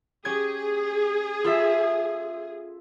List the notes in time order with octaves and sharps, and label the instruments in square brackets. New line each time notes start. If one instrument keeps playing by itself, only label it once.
[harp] C#4 G4 G#6 [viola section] G#4
[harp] F4 A4 E5